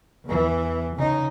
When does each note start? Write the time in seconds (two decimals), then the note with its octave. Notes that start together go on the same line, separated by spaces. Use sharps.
0.25 E2 E3
0.96 C#3 D#4